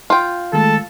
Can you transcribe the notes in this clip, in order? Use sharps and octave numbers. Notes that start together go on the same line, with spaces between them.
F4 G5
D#3 G#3 A3 A4